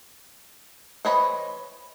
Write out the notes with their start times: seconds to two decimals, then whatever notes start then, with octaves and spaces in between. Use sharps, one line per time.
1.05 E3 C5 C#5 D#5 B5